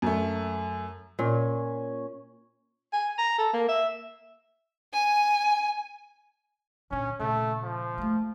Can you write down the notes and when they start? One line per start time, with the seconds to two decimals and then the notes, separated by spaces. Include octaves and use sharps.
0.02 F#2 A3
1.19 A#2 C#4
2.93 G#5
3.18 A#5
3.38 A4
3.53 A#3
3.68 E5
4.93 G#5
6.91 A#2 D3 C#4
7.20 A#2 C#3 A3
7.63 F3
7.98 A3 A#3